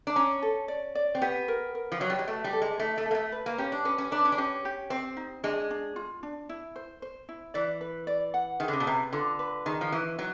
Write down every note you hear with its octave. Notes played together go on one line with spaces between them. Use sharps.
D4
C#4 A#5
A4
D5
D5
C4
B3 G4
A#4
A#4
F3
F#3 C#5
G3
G#3
A3 F#4
G3
A4
G#3
A3 D#4
A3
A#3 A4
A3
B4
A#3
C#4 G4
D4
C#4 B4
C#4
D4 B4
C#4
D4
C#4 G4
G4
C4 C5
D#4
G#3 D4
D4
F4
D4
E4
C5
C5
E4
E3 D5
B4
D5
F#5
D#3 G#4
D3
C#3
B2
C3 B4
D3 F4
B4
D#3 G#4
F3
E3 D#4
F#3 D#4